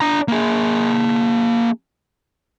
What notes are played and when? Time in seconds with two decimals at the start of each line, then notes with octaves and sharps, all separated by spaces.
0.01 D4 A#5
0.28 A#3 G#4